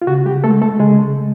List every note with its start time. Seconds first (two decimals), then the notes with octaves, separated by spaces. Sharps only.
0.02 F4
0.07 C#3 F#4
0.26 G3 G4
0.43 G#3 A3 A4
0.61 A3 A4
0.79 C#3 G#3 G#4
1.16 G#3